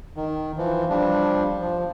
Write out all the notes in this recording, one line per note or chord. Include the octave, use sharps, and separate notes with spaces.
D#3
E3 F3
F3 G3 D4
F3